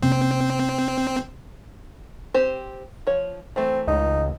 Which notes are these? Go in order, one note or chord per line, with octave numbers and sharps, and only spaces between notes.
C3 A#3 C4 C#4
C4 G4 C5
F3 C#5
E3 A3 C4
C#2 D#4